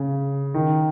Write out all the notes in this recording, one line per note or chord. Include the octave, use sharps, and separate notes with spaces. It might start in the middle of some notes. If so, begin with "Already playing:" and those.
Already playing: C#3
D#3